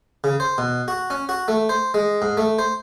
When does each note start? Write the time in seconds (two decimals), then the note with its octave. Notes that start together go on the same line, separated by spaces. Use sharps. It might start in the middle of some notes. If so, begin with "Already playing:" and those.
0.24 C#3
0.40 C5
0.58 B2
0.88 F#4
1.10 C#4
1.29 F#4
1.48 A3
1.69 C5
1.94 G#3
2.22 G#2
2.37 A3
2.59 C5